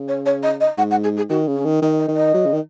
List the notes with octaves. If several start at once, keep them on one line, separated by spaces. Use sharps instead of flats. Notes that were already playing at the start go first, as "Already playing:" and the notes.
Already playing: C#3
C#5
C#5
D#5
D#5
G#2 F#5
F#5
G#4
G#4
D#3 F#4
C#3
C#4
D#3
D#3 D#5
D#5
D#3
D#5
F#3
C#3
D#3